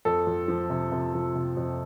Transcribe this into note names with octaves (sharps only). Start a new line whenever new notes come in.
F2 A4
F2
F3
C3
C3
F3
C3
F2